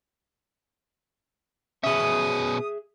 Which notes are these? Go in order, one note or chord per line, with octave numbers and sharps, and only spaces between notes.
B2 C#4 G#4 E5 D#6